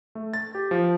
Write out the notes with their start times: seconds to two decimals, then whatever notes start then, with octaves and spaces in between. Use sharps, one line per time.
0.15 A3
0.34 A6
0.55 G4
0.71 F3